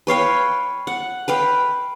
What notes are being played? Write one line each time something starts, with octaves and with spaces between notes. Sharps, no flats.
B4 C#5 F5 G5
F#5
B4 F5 G5